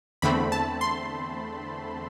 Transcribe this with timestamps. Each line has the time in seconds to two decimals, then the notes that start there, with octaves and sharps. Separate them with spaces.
0.22 E2 D3 A3 C4 B5
0.52 A5
0.81 C6